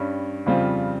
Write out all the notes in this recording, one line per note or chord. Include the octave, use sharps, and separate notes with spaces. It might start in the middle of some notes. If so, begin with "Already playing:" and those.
Already playing: G2 G3 C#4
F2 C#3 G3 C4 F4